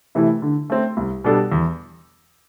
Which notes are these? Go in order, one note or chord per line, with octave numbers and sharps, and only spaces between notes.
C3 E3 A3 E4
D3
A3 C4
C2
B2 G3 D4 A4
E2